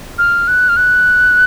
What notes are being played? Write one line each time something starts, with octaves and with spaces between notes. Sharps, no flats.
F6
F#6
F6
F#6